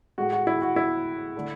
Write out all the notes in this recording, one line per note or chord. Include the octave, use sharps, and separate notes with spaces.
A2 G#3 F#4
F#4
E4
F#4
E4
D3 A3